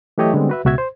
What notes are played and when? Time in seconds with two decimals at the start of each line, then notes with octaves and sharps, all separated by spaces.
0.18 E3 F#3 A3 G4 C#5 D#5
0.34 D3 G3 G#3 B3 C4
0.49 F#4 B4 E5
0.65 C#2 B2 F#4 E5 G#6
0.78 C5